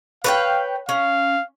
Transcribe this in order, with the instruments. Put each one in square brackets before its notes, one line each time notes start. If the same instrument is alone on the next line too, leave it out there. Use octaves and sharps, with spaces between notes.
[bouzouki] B4 C#5 G5 [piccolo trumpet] F5
[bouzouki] C#4 [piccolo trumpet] F5